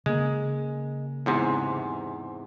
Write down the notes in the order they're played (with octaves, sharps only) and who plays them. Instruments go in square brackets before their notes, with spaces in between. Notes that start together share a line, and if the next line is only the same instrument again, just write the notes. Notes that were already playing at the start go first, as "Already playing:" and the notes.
[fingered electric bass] C#3 A#3 [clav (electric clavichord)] G#3
[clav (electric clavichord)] E2 G#2 C3